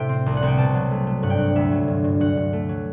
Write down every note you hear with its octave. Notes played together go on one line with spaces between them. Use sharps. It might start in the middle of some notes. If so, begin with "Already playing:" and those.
Already playing: A2 C3 E5 G5
C4
C2
F#5
C2 G5
B2 A5
F#3
A3
A3
G2 F#5
G5
G2 F#5
D2 E5
F#3
G2
G2
G2 F#5
G2
A3
F#3